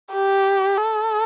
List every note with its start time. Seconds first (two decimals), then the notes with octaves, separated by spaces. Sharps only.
0.14 G4
0.77 A4